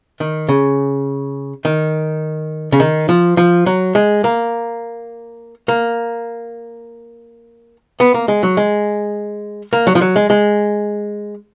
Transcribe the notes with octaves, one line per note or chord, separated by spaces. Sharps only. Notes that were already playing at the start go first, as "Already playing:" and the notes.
D#3
C#3
D#3
C#3
D#3
F3
F3
F#3
G#3
A#3
A#3
B3
A#3
G#3
F#3
G#3
A#3
F#3
F3
F#3
G#3
G#3